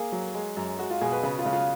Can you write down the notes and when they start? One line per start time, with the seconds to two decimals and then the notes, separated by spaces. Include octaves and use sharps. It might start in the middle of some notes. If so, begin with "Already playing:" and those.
Already playing: A#3 G#4
0.12 F#3
0.34 G#3
0.57 F#2
0.78 G#3 F#4
0.90 F4
1.01 B2 G#4
1.12 B4
1.23 C#3 B4
1.38 F4
1.46 C#3
1.53 F4